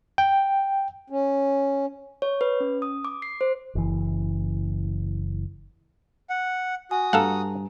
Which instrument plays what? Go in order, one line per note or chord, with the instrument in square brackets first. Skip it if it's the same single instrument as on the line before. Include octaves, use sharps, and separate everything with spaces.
[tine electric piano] G5
[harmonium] C#4
[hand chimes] C#5
B4
C#4
D#6
D6
C7
C5
[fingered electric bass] F#1 E3
[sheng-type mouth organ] F#5
[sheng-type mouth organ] F#4 D#6 [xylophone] G#5
[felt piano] G2 [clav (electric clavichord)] A4 F5 F#5 [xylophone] A5 A#5